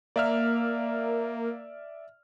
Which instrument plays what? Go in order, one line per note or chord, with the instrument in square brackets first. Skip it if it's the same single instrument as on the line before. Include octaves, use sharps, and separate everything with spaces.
[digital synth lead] A#3 [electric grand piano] D5 E5 F6